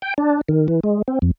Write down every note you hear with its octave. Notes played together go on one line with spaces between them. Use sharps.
G5
D4
D#3
E3
G#3
C4
F2